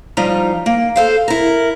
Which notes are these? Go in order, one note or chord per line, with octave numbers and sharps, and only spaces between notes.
F3 G3 D#4 F4
A#3
A4 C5 F5
E4 A#4